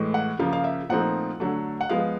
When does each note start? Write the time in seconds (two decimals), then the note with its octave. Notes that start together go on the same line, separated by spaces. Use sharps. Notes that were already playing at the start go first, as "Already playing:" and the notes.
Already playing: A2 E3 G#3
0.14 F#5
0.39 C#3 F3 A#3 F5
0.53 F5
0.64 E5
0.89 A#2 F3 A3 C4 D#4 F#5
1.40 D3 F#3 A3
1.81 F#5
1.89 F3 G#3 B3 F5